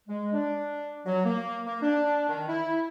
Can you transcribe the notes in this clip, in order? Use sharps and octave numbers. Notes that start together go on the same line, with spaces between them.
G#3
D4
F#3
A#3
A#3
D4
D#3
E4